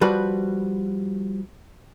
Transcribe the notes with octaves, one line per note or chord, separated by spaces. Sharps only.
F3 G3 F#4 B4